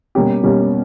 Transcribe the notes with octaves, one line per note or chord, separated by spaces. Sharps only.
B2 G3 A#3 C#4 G4
B2 G3 A#3 C#4 G4